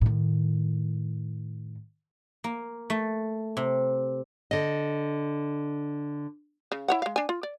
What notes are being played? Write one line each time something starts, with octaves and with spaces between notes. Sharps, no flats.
A2 D#3
A#3
A3
C3
D3 D#5
C#3
E4 C#5 F#5
G#3 F5
D4 G#5
F4
D5